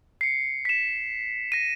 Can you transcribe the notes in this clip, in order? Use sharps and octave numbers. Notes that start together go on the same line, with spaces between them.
C7 C#7
B6 E7
A#6 D#7